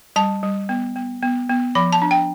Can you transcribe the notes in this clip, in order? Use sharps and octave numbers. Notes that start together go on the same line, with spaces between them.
G3 A5
G3
B3
B3
B3
B3
F3 B5
A5
D4
G5